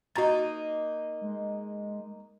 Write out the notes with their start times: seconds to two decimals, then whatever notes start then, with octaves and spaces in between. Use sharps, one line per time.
0.16 A#3 D#4 F#4 A#5 A6
1.21 G#3